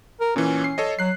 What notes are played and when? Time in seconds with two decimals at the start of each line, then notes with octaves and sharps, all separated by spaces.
0.20 A#4
0.36 A#2 E3 C#4
0.64 C7
0.78 A4 C#5 D#5
0.99 F#3 F#6 C7